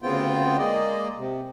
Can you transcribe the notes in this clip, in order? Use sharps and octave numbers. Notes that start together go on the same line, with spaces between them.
D2 C#3 B3 C4 F4 G5
G#3 A#3 D5 D#5
C3